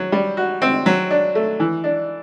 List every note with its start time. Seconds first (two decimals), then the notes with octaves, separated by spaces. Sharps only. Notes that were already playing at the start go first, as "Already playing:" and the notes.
Already playing: F#3
0.12 G3
0.37 F#4
0.62 C4
0.86 F#3
1.11 D4
1.35 A3
1.60 E3
1.84 D4